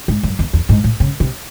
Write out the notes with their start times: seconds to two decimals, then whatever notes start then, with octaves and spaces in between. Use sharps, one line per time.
0.08 G#2
0.23 F#2
0.39 E2
0.53 E2
0.69 G#2
0.84 A2
1.00 C#3
1.20 C3